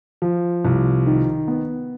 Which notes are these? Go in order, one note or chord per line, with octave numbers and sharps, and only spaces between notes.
F3
C2
D#3
B3